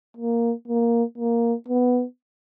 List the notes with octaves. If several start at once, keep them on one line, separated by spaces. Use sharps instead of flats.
A#3
A#3
A#3
B3